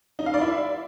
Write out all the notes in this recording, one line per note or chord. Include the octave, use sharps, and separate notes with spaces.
D#4
F5
D5
E4